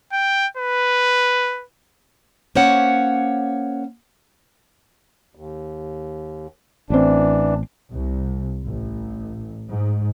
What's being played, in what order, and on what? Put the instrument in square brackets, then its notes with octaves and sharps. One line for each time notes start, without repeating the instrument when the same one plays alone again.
[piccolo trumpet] G5
B4
[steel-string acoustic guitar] A#3 C#4 C5 C#5 F#5
[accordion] D#2
[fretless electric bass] A1 C4 [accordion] E3 D4
[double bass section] C2
A1
G#2